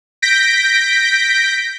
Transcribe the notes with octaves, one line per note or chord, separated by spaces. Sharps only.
G6 A#6 B6 D7